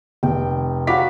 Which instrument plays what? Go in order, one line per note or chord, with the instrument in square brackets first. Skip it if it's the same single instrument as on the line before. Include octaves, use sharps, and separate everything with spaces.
[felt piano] F1 [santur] G5
[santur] F#3 F#4 F5 [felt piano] B5 D6 B6